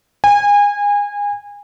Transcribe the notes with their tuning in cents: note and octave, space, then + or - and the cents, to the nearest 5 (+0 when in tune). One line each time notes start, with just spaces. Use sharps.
G#5 -25